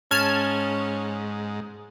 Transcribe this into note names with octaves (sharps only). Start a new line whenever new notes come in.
G#2 C#4 A5 F6 G#6